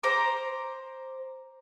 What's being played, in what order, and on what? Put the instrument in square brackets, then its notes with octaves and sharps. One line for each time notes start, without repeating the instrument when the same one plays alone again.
[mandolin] C5 A#5 D6